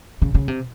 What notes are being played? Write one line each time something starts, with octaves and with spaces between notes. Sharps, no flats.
C#3
C#3
C3